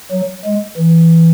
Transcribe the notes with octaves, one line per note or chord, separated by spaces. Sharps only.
F#3
G#3
E3